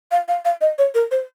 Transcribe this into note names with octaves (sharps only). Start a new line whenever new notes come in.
F5
F5
F5
D#5
C#5
A#4
C5